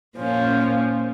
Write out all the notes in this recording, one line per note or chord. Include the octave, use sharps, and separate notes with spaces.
A#2 F3 C#4